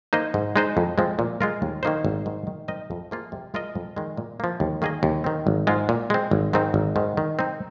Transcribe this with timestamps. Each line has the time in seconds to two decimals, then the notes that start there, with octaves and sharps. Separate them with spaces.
0.13 A#3 D#4 C5 D#5
0.34 G#2
0.56 G#3 D#4 C5 D#5
0.77 F2
0.98 F3 G#3 C4
1.19 A#2
1.41 G#3 F4 A#4
1.62 D#2
1.83 D#3 A#3 D#4 C5
2.05 G#1
2.26 G#2 D#3
2.47 D#3
2.68 C4 D#4 A#4 D#5
2.91 F2
3.11 F3 A#3 F4 G#4
3.32 C3
3.54 G#3 F4 A#4 D#5
3.75 F2
3.96 D#3 G#3
4.17 A#2
4.40 F3 A#3
4.60 D#2
4.82 D#3 A#3 G#4 D#5
5.03 D#2
5.24 D#3 C4
5.47 G#1
5.67 G#2 G#3 F4
5.89 A#2
6.10 G#3 C4
6.31 G#1
6.53 G#2 D#3 C4 D#4
6.74 G#1
6.96 G#2 D#3
7.17 D#3
7.39 C4 D#4